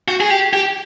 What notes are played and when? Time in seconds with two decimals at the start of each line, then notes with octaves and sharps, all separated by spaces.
0.08 F#4
0.20 G#4
0.30 G4
0.53 G4